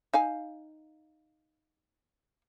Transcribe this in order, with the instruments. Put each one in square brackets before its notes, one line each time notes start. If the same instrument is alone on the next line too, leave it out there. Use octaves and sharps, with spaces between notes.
[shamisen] D#4 F5 G#5